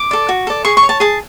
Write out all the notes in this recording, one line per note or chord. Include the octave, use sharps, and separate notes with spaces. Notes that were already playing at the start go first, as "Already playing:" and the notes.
Already playing: D6
A4 D5
F#4
A4 D5
G#4 C#6
C#6
C#5
A5
G#4 A5